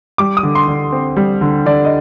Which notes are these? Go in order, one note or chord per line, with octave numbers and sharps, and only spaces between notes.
G3 D6
D#6
D3
C6
D3
C4
G3
D3
D3 D5
D#5